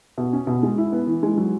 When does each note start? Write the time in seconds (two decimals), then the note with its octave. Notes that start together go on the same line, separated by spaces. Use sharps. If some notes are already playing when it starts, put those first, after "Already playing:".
0.18 B2
0.33 C#4
0.47 B2
0.63 G#3
0.78 E4
0.92 B3
1.07 E3
1.23 G#3
1.38 F#3